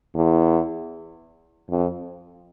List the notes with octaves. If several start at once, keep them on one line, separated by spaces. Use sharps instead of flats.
E2
F2